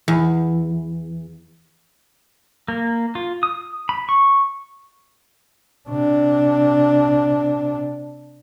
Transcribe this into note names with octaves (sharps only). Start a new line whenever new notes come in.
E2
A#3
F4
D#6
B5
C#6
C3 D4